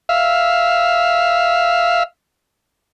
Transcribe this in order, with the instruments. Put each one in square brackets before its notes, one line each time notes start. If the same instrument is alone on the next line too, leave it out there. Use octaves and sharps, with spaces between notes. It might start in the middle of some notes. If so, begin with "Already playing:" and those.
[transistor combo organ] E5 F5